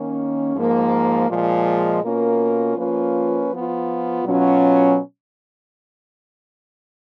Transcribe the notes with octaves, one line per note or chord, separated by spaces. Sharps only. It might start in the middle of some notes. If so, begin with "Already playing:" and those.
Already playing: D#3 A#3 C#4
G#2 F3 A#3
A#2 F3 G#3
B2 A#3 C#4 F4 A#4
F3 A#3 C#4 F4 B4
F3 B3 F4
B2 F#3 C#4 F4